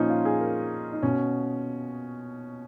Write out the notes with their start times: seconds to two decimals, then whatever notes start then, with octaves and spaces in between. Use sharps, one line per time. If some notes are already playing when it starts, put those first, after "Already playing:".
Already playing: A#2 F3 C#4 D#4
0.10 F4
0.25 G#4
0.40 A#4
0.93 D#4
1.02 B2 C#4